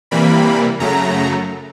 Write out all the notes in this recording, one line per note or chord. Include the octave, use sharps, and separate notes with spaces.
C3 E3 G3 A#3 B5
F#2 C#3 F#3 A3 A#5